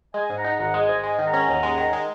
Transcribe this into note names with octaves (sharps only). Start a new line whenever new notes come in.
G#3 D#5 G#5
G#2
F#5 A#5
D#4
G#1 F#5 A#5
G#3
D#5 G#5
G#2
G#3 D#5 G#5
D#3
F#5 A#5
C#4
D#2
G#3
D#3
G#3